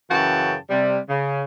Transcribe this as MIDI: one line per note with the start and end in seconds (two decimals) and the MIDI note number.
0.11 0.55 42
0.11 0.55 49
0.11 0.55 52
0.11 0.55 66
0.11 0.55 79
0.11 0.55 81
0.70 0.99 48
0.70 0.99 55
1.09 1.44 49